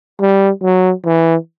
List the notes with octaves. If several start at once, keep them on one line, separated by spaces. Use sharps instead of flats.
G3
F#3
E3